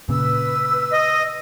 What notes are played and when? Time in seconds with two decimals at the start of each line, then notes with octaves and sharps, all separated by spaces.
0.09 A#2 C#3 B4 E6
0.92 D#5